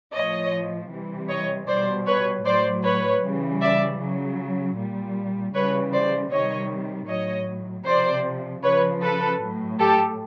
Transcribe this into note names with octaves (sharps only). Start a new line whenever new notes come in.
A2 F3 C#5 D#5
C3 E3 G3
C#5 D#5
B2 G3 C5 D5
B4 C#5
A2 F#3 C5 D5
B4 C#5
C#3 E3 G3
D5 E5
C#3 F#3
A#2 G3
C#3 E3 G3 B4 C#5
C5 D5
C3 D#3 G3 C#5 D#5
A2 F#3 C#5 D#5
C3 F3 C5 D5
C#3 F3 B4 C#5
A4 B4
A2 F#3
G4 A4